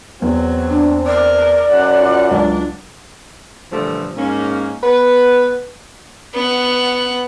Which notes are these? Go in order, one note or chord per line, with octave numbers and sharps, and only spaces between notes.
E2 F#3 C4
D4
A#4 D5
F#2 F#5
F4
C#2 F#3 D4
A#2 D3 E3 F3 G3 A3
G#2 A#3 C#4
B3 B4
B3 F#5